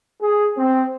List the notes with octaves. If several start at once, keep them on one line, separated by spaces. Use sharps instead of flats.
G#4
C4